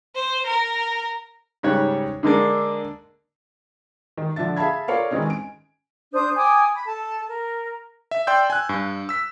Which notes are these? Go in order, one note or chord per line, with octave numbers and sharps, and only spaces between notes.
C5
A#4
G#2 C#3 G3 C#5 F#6
D3 G#3 A#3 D4
D#3
D3 F3 D4 E5 A6
G#4 E5 F5 A5 B5 G#6
F4 A4 A#4 C#5 D5 F5
D#3 E3 G#3 C4 C#4 D#4
G#5 D7
D4 C5 D#6 G6
G5 G#5 D6 D#6
B5
A4 A5
A#4
E5
D5 G5 C6 E6 G6
G#5 F#6
G2
E6 B6